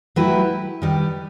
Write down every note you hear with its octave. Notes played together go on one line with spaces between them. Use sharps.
F#3 A3 E4 G4 B4
D#3 G3 D#4 G4 B4